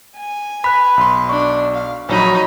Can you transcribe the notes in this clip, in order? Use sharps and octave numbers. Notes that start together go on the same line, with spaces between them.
G#5
B4 B5 F#6 B6
B1 C6
D4 C#6
F5
A#1 F#3 D#4 C#5 B5